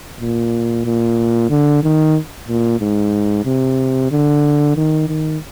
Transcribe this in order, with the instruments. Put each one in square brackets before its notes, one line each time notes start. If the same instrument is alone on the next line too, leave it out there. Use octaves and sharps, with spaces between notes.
[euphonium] A#2
A#2
D3
D#3
A#2
G#2
C3
D3
D#3
D#3